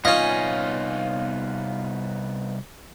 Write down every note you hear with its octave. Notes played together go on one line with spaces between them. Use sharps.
C2 B3 C#4 D#4 F4 C#5 D#5 G#5